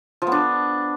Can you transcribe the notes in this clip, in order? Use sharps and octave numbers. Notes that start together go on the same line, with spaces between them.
F3
B3
D4